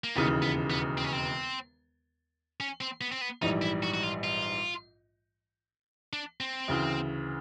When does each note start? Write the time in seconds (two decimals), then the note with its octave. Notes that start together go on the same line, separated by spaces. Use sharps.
0.04 A#3
0.16 E1 D#2 C#3 E3 B3
0.42 B3
0.70 B3
0.98 C4
1.04 C#4
1.13 C4
2.60 C#4
2.81 C4
3.01 B3
3.12 C4
3.21 B3
3.42 A#1 G#2 E3 G3 D#4
3.62 E4
3.83 F#4
3.94 F#4
4.03 F4
4.24 F4
6.13 D4
6.41 C4
6.68 D2 C#3 E3